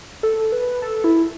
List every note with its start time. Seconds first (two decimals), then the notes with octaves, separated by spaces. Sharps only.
0.23 A4
0.52 B4
0.82 A4
1.04 E4